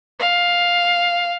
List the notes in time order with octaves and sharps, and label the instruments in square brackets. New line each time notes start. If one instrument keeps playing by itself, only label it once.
[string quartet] F5